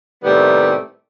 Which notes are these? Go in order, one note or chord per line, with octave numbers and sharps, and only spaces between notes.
A2 C3 D#3 G3 A3 B3